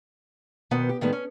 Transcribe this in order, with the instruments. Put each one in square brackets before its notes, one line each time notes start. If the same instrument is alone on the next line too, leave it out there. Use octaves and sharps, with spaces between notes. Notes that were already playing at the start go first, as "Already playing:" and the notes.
[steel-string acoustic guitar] B2 D#3 B3 C5 F#5
G4
A2 D#3 G3 G#3 B3
C#4